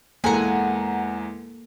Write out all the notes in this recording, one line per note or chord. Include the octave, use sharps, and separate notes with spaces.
E2 G#3 A#3 A4 F#5 G#5 A#5